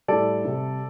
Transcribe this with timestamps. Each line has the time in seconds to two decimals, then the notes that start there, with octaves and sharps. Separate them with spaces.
0.08 A2 G3 A4 D5
0.45 C3 G3